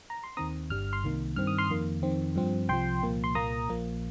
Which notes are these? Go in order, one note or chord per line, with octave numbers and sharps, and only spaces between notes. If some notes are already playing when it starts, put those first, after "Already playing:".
A#5
C6
D#2 D#3 C4 A#5 D#6
G1 G2 G3 F6
C6 F6
C2 C3 D#3 A#3
G2 D#3 C4 F6
D#6
C6 F6
F2 D#3 A#3
F2 D#3 C4
G2 F3 C4
C2 C3 F3 G5 C6
C2 A#2 F3 A#3
C6
C2 A#2 A#3 A#5 D#6
A#1 A#2 F3 A#3